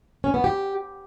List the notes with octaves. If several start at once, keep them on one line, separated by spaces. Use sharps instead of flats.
C#4
B3
G4